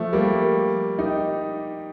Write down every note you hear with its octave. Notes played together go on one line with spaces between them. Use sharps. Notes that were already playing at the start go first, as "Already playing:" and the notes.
Already playing: F3 A3
G3 A#3
D#4 G4